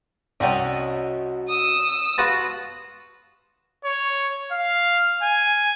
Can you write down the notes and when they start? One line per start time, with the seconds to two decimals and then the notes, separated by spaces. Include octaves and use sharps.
0.40 C2 C#4 F#4 D5 D#5 G5
1.49 D#6 E6
2.18 F#4 B4 F5 A5 C6
3.85 C#5
4.52 F5
5.23 G#5